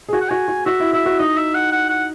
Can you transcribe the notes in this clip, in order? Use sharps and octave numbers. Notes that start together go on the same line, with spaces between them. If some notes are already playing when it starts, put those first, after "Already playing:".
G#4
F#4 G#5
F#5
F#4 G#5
F#4
F#4 E5
E4
E4 E5
F#4
D#4 D#5
E5
F#5
F#5
F#5